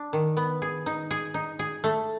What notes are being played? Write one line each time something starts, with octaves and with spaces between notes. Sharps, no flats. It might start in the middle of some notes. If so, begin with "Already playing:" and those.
Already playing: D4
D#3
B3
G#4
D#4
G#4
D#4
G#4
A3